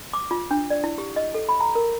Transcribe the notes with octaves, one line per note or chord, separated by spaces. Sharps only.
D6
F4
D4
D5
E4
G4
D#5
A4
B5
A#5
A#4